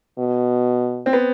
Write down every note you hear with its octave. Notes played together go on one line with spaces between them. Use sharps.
B2
C4
B3